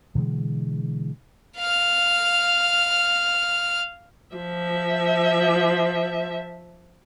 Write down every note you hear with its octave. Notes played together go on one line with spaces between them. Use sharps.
B2 D3 E3 G#3
F5 F6
F3 E5